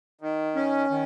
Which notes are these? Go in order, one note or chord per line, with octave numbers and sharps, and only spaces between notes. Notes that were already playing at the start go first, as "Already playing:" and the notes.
D#3
C#4
D#3